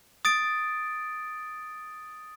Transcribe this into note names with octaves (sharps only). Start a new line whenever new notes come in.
D#6 A6 D7